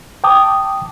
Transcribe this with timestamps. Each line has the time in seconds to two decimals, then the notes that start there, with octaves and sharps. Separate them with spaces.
0.24 G5 A5 D6 D#6